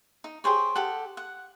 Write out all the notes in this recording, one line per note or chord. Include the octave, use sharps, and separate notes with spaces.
D#4
G4 G#4 C5 C#5
G4 A4 F#5
F#5